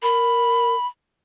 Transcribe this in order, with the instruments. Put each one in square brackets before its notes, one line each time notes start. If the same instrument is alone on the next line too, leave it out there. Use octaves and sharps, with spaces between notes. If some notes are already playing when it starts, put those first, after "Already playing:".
[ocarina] A#4 [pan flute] B5